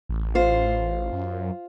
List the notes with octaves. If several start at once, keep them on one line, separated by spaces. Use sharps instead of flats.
A1
F4 C5
F#2